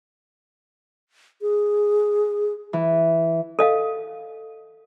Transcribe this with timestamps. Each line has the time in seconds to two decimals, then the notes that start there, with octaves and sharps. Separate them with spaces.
1.42 G#4
2.73 E3
3.59 A4 D#5 F5